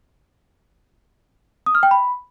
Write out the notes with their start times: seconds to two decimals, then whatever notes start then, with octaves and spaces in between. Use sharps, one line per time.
1.66 D#6
1.75 F6
1.83 G5
1.91 B5